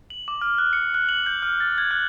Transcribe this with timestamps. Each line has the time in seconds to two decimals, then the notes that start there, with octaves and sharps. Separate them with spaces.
0.10 F#7
0.28 D6
0.41 F6
0.58 F#6
0.73 C#7
0.94 F#6
1.09 F#7
1.26 G6
1.42 F6
1.60 A6
1.78 G#6
1.91 F#6